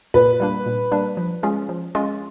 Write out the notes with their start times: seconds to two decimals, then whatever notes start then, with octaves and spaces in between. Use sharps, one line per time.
0.14 A#2 B4
0.40 G3 A#3 D4
0.66 A#2
0.92 G3 A#3 D4
1.17 F3
1.43 G#3 C#4 F4 G#4
1.69 F3
1.95 G#3 C#4 F4 G#4